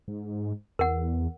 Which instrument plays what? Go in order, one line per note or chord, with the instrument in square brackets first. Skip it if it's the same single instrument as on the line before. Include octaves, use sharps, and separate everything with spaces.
[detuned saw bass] G#2
[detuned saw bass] E2 [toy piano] A#4 F#5